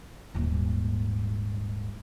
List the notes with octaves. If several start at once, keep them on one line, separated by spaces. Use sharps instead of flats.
D#1 G#2